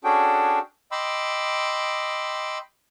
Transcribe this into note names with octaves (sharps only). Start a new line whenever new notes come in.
C#4 D4 F#4 G#4 A4 G5
D#5 G5 B5 C6 D6 E6